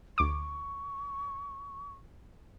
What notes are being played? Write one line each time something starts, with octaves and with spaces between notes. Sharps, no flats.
D2 C#6 D6